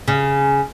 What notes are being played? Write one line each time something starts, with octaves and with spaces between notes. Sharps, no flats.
C#3